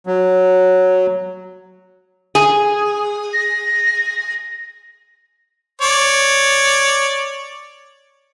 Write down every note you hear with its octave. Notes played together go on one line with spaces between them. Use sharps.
F#3
G#4
A#6
C#5 D5